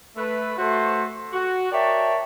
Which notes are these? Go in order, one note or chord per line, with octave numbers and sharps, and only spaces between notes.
A3 B4
A3 F#4 C5
F#4
A#4 C#5 D5 E5 G5 A5